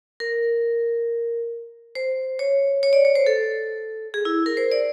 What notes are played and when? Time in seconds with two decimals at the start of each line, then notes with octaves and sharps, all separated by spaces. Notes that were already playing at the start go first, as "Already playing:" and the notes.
0.20 A#4
1.95 C5
2.39 C#5
2.83 C#5
2.93 D5
3.05 C#5
3.15 C5
3.26 A4
4.14 G#4
4.25 E4
4.46 A#4
4.57 C5
4.72 D5